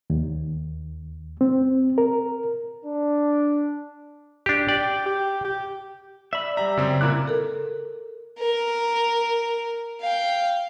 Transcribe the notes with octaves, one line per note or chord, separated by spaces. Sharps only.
D#2
C4
A#4
D4
D4 G4
G4 D5
G4
G4
D5 E5 B5
G3 G4 E5 A#5
F#2 C#3 C4
A#2 A#3 E4 A#4 D6 F#6
A4 A#4
A#4
F5 G5